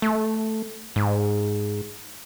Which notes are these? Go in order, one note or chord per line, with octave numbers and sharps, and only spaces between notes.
A3
G#2